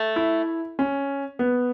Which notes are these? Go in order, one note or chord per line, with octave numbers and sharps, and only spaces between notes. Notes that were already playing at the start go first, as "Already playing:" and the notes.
Already playing: A3
E4
C#4
B3